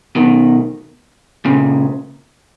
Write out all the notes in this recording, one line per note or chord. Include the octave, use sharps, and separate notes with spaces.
B2 D#3
A#2 C#3